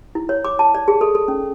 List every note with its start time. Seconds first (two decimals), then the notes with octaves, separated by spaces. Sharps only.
0.15 E4
0.29 C#5
0.45 D6
0.59 A5
0.75 D5
0.88 G#4
1.01 A4
1.15 A4
1.28 C#4